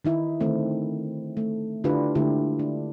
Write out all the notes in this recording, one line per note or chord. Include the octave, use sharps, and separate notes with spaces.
D#3 D#4 E4
D3 D#3 A3 C4
A3
D3 D4 E4 F4 G4 B4
D3 G#3 A3 E4 G4
D4